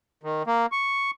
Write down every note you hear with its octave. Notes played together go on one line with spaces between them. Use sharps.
D#3
A#3
C#6